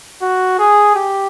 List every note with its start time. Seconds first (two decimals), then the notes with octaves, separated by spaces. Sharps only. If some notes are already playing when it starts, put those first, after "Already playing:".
0.22 F#4
0.59 G#4
0.96 G4